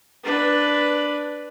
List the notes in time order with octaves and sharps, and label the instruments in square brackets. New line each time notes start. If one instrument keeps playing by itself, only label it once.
[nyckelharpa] D4 B4